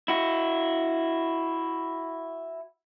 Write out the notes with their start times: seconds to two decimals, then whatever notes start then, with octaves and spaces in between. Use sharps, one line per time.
0.08 E4 F#4